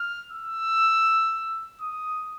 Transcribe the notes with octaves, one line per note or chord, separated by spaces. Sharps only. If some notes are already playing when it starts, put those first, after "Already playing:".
Already playing: F6
E6
D#6